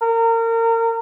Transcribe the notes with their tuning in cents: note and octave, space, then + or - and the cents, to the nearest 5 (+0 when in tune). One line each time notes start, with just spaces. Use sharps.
A#4 -30